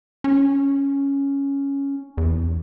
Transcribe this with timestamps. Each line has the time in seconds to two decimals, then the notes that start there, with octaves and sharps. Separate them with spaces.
0.24 C#4
2.17 E2